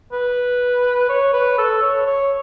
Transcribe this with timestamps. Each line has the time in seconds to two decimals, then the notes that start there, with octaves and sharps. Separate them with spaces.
0.13 B4
1.09 C#5
1.34 B4
1.58 A4
1.82 C#5
2.06 C#5